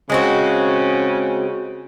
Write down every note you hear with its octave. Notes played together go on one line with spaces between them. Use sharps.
C#3 G#3 C4 F#4